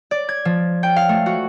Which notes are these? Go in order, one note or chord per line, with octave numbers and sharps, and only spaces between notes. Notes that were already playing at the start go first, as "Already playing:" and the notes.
D5
G#6
F3
G5
F5
A3
F#4